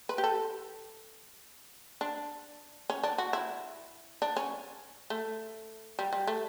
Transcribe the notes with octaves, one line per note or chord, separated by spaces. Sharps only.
B4
G4
A4
D4
C#4
D4
F#4
E4
D4
C#4
A3
G3
G3
A3